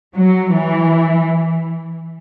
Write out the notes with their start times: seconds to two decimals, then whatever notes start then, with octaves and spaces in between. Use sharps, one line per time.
0.16 F#3
0.54 E3